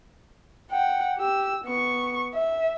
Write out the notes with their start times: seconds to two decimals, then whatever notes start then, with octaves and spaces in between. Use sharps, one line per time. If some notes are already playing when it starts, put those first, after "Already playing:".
0.71 F#5 G5
1.18 G4 E6
1.64 B3 C#6
2.34 E5